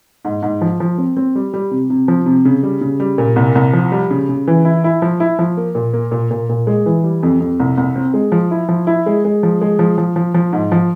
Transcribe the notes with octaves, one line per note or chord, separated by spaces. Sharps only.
G#2
G#2
F3
F3
C4
C4
G3
G3
C3
C3
F3
C3
C#3
G3
C#3
G3
A#2
C2
C2
F3
G3
C#3
C#3
E3
E4
E4
F3
E4
F3
A#3
A#2
A#3
A#2
A#2
A#2
G#3
E3
G3
F2
F2
C2
C2
C4
G#3
F3
E4
F3
E4
G#3
G#3
F3
G#3
F3
F3
F3
F3
G#2
F3